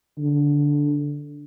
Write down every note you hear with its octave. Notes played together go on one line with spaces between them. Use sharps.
D3